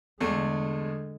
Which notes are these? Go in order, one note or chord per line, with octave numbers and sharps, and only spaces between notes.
E2 D3 G#3 A3